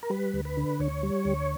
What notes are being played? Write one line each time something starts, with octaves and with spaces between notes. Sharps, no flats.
A#4
G3 B4
D2
B4
D3
D2 C#5
G3
D2